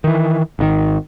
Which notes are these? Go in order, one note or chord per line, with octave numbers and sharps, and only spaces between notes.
D#3 E3
G#1 C3 D#3